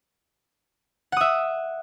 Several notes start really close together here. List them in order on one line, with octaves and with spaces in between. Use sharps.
F#5 D#6 E5